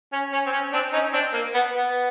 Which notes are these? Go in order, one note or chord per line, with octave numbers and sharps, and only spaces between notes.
C#4
C#4
C4
C#4
C4 D4
C#4 D#4
C4 D4
A#3
B3
B3